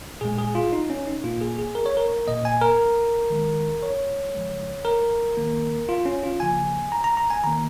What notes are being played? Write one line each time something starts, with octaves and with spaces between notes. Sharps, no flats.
A#2 G#3 G#4
G#4
F4
D#4
C#4
D#4
A#2 A#3 F4
G#4
G#4
A#4
C#5
A#4
A#2 A#3 D#5
G#5
A#4
D#3 G#3
C#5
C#3 F3 G#3
A#4
D#3 A#3
F4
C#4
F4
C#3 F3 A#3 G#5
A#5
A#5
A#5
G#5
D#3 A#3 A#5